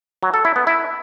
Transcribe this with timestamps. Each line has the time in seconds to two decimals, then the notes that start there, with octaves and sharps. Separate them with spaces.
0.23 F#3
0.34 A4
0.45 E4
0.56 B3
0.67 E4